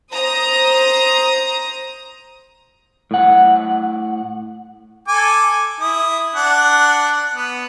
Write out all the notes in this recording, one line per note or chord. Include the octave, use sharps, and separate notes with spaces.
C5 A#5 D#6
A2 F#5
A4 G#5 D6
E4 D#6
D4 F#5
B3